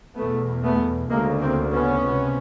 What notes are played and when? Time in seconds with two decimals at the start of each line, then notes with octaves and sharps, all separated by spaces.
0.16 E2 B2 A3 B3
0.63 A3 B3
1.09 D2 C#3 G#3 A#3
1.40 A#3 C4
1.71 B3 C#4
2.02 C#2 C3